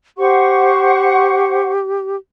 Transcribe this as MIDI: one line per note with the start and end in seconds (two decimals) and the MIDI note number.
0.18 2.16 67
0.18 1.69 72
0.18 1.69 78
0.18 1.69 85